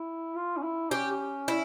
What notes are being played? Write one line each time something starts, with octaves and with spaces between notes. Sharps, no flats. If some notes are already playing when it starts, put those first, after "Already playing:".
Already playing: E4
F4
C#4
E4
C#4 G4
E4